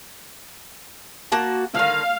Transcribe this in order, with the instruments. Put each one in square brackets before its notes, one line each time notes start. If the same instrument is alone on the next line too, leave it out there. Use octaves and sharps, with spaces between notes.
[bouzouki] A#3 F#4 A5
[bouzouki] D3 D#3 [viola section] F5